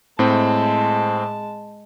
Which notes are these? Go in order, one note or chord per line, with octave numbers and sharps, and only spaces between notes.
A2 G#3 C4 A5